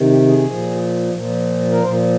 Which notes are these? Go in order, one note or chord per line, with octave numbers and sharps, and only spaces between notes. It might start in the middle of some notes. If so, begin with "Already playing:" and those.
Already playing: C3 D#3
G4
G#4
A#2 F3
A#2 F3
A#4
A#2 F3 C5